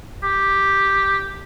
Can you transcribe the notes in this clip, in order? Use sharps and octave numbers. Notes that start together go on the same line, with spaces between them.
G4